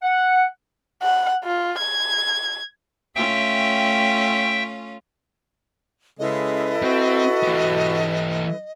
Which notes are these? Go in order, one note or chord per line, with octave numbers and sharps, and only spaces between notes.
F#5
F#5
F4
G#6
A3 C#4 F4 E5 G5
C#3 G#3 E4 A4 B4 D#5
C4 F#4
E3 G4